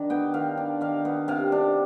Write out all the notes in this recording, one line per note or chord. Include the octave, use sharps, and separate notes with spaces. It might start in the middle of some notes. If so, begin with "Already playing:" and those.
Already playing: D#3 D4
B3 G5
D#3 F5
D4
D#3 F5
B3
C3 F5
D4